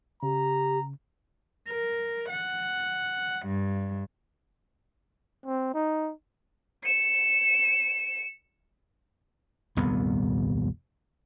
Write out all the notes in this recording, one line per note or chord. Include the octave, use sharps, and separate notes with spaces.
C#3 G4 A#5
A#4
F#5
G2
C4
D#4
C#7 E7
D#1 C2 F2 B3